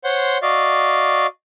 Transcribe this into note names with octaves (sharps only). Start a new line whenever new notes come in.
C5 C#5 F#5 C6
F#4 D5 D#5 F5